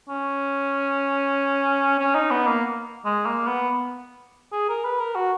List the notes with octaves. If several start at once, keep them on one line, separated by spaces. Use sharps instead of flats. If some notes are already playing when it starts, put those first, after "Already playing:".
C#4
C#4
D#4
B3
A#3
G#3
A#3
B3
G#4
A#4
B4
A#4
F#4